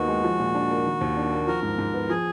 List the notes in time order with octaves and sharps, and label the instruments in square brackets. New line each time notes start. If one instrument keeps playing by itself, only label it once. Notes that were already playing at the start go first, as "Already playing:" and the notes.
Already playing: [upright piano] D#2 D#3 B3 D#4 [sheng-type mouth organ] F#4
[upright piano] G#3
F3
A#2
D4
A#3
D#3
D#2
D4
A#3
[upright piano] F3 [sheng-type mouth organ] A#4
[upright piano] G#2
G#2
B3
[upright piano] F3 [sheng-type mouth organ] G#4